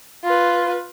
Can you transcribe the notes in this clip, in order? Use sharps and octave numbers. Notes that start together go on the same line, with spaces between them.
F4 B4